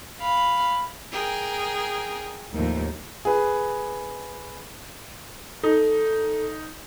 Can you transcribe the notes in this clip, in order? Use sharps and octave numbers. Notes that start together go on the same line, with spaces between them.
F5 B5
G#4 A#4 G5
D#2 A2 F3
G#4 B4
D#4 A4